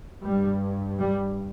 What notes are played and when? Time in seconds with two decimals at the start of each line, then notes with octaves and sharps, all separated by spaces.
0.23 G2 G3
0.98 G3